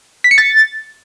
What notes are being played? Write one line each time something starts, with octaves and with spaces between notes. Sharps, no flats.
B6
C#7
A6